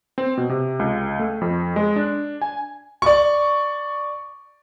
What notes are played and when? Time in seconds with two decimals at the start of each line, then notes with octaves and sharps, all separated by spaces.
0.18 C4
0.37 B2
0.49 C3
0.79 C#2
1.19 A3
1.41 F2
1.76 G#3
1.96 D4
2.42 G#5
3.02 D5 C#6